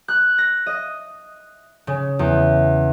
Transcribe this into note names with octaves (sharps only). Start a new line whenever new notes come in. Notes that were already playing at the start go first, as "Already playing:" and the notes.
F#6
A#6
D#5
C#3
E2